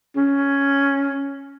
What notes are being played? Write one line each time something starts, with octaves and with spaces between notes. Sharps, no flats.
C#4